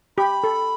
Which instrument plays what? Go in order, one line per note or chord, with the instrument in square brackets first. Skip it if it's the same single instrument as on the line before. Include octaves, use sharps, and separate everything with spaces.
[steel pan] G4 [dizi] B5
[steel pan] A4